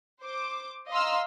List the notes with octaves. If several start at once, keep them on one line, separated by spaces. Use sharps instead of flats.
C5 D6
D#5 F5 A#5 C6 E6 F6